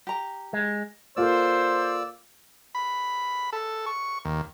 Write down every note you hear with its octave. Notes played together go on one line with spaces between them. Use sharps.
G4 A#5
G#3
A#3 F4 A4 C5 D5 E6
B5
A4
C#6
D#2